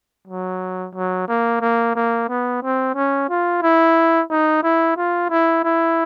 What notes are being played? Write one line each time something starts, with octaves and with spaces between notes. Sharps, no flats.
F#3
F#3
A#3
A#3
A#3
B3
C4
C#4
F4
E4
D#4
E4
F4
E4
E4